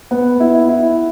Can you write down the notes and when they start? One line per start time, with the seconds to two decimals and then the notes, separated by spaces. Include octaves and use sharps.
0.11 B3
0.40 E4
0.69 E4